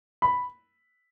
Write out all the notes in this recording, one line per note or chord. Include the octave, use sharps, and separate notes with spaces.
B5